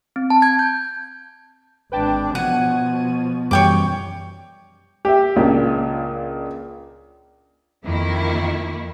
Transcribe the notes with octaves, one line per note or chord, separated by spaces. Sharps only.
C4
A5
G#6
G6
G#1 D4 B4 G5 A5
B2 F3 F#5 G#6 D#7
F#2 E3 G3 C#5 G5 D6
G4 E5
C#2 A#2 D4
F2 D#3 F3 A#3 E4